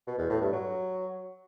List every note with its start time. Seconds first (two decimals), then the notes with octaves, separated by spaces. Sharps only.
0.07 B2
0.18 E2
0.30 A2
0.41 G2
0.52 F#3